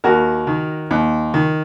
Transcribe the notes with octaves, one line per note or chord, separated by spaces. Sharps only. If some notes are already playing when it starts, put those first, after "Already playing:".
D#2 F#4 A#4
D#3
D#2
D#3